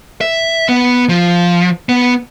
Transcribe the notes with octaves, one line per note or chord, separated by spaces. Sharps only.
E5
B3
F3
B3